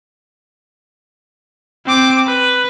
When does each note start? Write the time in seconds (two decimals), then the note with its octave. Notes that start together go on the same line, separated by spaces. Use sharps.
1.85 C4 D6
2.26 B4